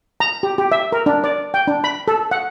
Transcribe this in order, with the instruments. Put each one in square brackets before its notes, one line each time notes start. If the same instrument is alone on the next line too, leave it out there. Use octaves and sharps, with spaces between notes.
[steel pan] A#5
G4
G4
E5
A#4
D4
D5
G5
D4
B5
A4
F#5